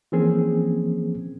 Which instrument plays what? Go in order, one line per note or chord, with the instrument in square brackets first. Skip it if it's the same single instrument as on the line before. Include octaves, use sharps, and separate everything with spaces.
[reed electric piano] E3 F3 A#3 C4 C#4 G#4